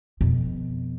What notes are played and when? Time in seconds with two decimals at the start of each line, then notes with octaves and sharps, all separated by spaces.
0.21 F2 B2